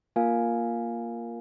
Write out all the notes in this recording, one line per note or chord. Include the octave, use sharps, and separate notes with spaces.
A#3 F4 A#4 F5 G#5